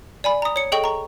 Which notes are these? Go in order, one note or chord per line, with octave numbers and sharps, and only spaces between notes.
D5 G#5 B5
A#5 D#6
C#5 C#7
G#4 A4 D#5 G5 C#6 F#7
A#5 C#6